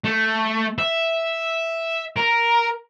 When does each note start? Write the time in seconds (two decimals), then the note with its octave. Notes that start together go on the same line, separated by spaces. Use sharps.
0.05 A3
0.79 E5
2.17 A#4